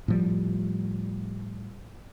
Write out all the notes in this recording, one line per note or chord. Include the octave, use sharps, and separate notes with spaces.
A2 F3 G3